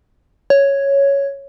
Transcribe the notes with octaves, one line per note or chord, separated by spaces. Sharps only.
C#5